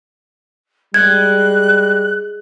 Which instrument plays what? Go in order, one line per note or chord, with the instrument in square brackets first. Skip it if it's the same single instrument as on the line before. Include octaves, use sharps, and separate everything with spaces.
[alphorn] G3 [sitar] G#3 [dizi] F#6 [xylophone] G#6